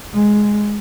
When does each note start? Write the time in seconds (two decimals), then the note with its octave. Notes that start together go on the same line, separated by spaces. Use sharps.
0.14 G#3